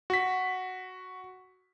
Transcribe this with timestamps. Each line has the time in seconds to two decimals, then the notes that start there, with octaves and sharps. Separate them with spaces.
0.10 F#4 B6